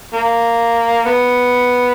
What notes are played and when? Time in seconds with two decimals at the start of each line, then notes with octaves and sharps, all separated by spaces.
0.13 A#3
1.05 B3